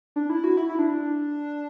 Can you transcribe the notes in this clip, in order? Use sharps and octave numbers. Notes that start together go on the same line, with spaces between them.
D4
E4
F#4
E4
E4
D4